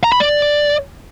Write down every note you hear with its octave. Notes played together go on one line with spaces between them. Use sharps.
A#5
B5
D5